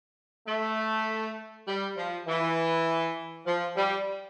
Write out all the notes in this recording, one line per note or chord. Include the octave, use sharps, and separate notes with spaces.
A3
G3
F3
E3
F3
G3